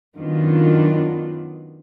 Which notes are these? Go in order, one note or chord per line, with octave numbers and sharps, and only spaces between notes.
F#2 D#3 F#3 B3 D4 F4